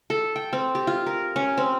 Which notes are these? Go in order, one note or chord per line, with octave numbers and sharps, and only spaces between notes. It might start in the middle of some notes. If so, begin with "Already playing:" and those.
A4
G5
C4
G4
F4
A#4
C#4
C4